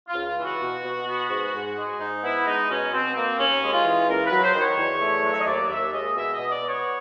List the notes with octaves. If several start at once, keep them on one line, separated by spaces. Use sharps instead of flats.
F4
C#2
F4
E3
F#4
B2
B2
B3
G#2
G#2
G#3
G#2 D#4
B3 E4
G#3 D#4
B2 C#4
B2 C4
A#3 C4
D#2 C#4
G#3
F4
E3
C#2 A#4
B4
F#3
C5
D#3
C#5
E2
A3
F#3
E5
D#5
D#2 D5
D#2 E5
G#3 D#5
B2 E5
D#5
B2
D5
B3
C#5